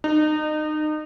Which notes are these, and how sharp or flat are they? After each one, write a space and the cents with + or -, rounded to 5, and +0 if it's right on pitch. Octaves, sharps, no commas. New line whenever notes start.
D#4 -30